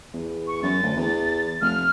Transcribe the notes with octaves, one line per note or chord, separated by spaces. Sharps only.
E2
C#6
F#2 A6
D2
E2
F1 F6